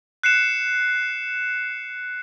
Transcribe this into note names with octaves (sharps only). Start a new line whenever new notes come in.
F#6 C7 C#7 E7